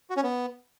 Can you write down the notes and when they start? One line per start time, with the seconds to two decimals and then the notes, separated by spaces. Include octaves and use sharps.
0.10 F#4
0.17 C#4
0.23 B3